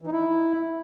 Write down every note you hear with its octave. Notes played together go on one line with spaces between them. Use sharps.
E3
D#4
E4